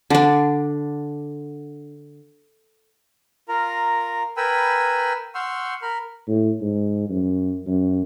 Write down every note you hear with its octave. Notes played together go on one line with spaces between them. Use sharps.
D3 D4
F4 A#4 A#5
A#4 B4 G5 G#5 B5 E6
F#5 C6 C#6 E6 F6 G6
A#4 B5 F6
A2
G#2
F#2
F#2